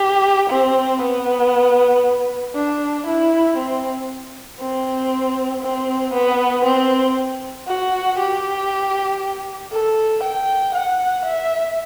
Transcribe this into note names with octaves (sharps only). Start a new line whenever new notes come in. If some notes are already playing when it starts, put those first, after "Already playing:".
Already playing: G4
C4
B3
D4
E4
C4
C4
C4
B3
C4
F#4
G4
A4
G5
F#5
E5